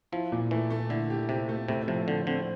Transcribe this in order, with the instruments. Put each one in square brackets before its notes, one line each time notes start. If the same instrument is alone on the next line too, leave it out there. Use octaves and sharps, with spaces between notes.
[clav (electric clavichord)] F3 [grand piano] E4
[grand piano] A#2
[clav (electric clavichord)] E3 [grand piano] A3
[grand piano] A3
[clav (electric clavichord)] D3 [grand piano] E4
[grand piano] G4
[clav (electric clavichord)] C3 [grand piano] G4
[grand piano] A3
[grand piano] A2 [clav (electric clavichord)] C3
[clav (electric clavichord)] C3 [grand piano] F3
[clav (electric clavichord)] D3 [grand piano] C4
[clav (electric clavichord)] D3 [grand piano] C4